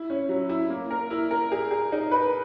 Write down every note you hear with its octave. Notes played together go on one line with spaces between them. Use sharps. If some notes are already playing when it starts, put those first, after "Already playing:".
Already playing: E4
C#4
F#3
E4
A#3
A#4
E4
A#4
G#4
G#4
D#4
B4